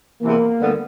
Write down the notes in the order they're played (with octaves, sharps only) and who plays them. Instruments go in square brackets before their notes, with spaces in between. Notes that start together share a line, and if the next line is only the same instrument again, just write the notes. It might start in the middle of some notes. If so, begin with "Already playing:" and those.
[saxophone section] E2 C3 E3 [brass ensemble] A#3
[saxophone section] D2 D3 G3 B3